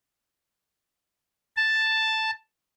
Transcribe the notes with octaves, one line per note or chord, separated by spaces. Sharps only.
A5